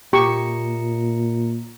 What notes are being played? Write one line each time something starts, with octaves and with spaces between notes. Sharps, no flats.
A#2 A#3 G4 A#5 C#6 C#7